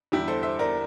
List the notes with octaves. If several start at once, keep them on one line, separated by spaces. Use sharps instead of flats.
E2 D3 G3 E4 G4
A4 C5
C5 E5
A#4 D5